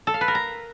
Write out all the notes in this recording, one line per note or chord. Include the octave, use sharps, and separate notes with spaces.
A4
F5
B4
A#4
A#5